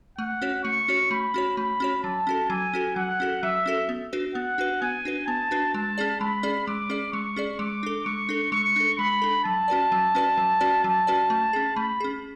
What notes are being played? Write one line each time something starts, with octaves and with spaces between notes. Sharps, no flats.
A3 F#5
C#4 F#4 C#5
A3 C#6
C#4 F#4 C#5
A3 B5
C#4 F#4 C#5
A3 B5
C#4 F#4 C#5
F#3 A5
C#4 F#4 A4
F#3 G#5
C#4 F#4 A4
F#3 F#5
C#4 F#4 A4
F#3 E5
C#4 F#4 A4
B3
D4 F#4 B4
B3 F#5
D4 F#4 B4
B3 G#5
D4 F#4 B4
B3 A5
D4 F#4 B4
G#3 A5
C#4 G#4 D5
G#3 B5
C#4 G#4 D5
G#3 D6
C#4 G#4 D5
G#3 C#6
C#4 G#4 D5
G#3 D6
D4 A4
G#3 C#6
D4 A4
G#3 C#6
D4 A4
G#3 B5
D4 A4
F#3 A5
C#4 F#4 B4 D5
F#3
C#4 F#4 B4 D5
F#3
C#4 F#4 B4 D5
F#3 A5
C#4 F#4 B4 D5
A3
C#4 G#4
A3 B5
C#4 G#4